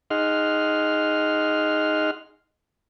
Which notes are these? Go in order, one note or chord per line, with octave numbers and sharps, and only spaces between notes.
D#4 G#4 D#5 F#5 C6 F6